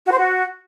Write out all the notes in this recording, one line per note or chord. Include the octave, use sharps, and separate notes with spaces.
F#4
C5
F#4